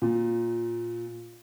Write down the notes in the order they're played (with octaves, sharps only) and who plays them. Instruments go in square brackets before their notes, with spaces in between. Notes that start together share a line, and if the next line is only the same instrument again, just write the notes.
[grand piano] A#2